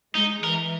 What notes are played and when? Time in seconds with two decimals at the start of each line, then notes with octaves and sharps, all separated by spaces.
0.15 G#3 D#4
0.43 E3 A#4